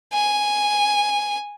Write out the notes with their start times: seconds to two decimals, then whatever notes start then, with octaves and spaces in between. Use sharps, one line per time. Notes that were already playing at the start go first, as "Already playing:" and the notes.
0.13 G#5